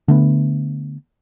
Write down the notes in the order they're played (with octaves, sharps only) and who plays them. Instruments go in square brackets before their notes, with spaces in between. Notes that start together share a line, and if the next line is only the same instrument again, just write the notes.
[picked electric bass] D3 A3 B3